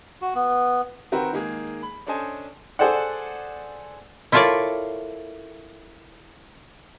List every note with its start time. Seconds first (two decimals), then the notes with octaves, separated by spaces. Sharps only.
0.22 F#4
0.35 B3
1.12 D#3 C4 F#4 A#4 B4
1.33 D#3 G#3 A#3 G#4
1.83 B5
2.07 C#4 D4 A4 C5 D#5 G#5
2.79 G#4 A4 C5 D5 F#5
4.32 E4 F4 A4 A#4 C#5 D5